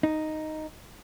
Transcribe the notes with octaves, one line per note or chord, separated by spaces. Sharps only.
D#4